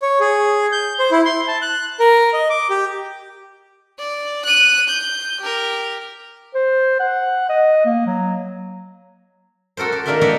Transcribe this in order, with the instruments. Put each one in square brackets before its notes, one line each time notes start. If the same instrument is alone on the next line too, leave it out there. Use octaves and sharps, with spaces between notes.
[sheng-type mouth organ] C#5
G#4
G6
C5
E4
C6
A5
F#6
A#4
D#5
D6
G4
[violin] D5
F#6 D#7
G6
G4 A#4
[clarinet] C5
F#5
D#5
A#3
F#3
[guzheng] F#4 A4 A#4 C5
G4
D#3 A#3 D4 A#4 E5 C6
B3 D#4 E4 F#4 D5 E5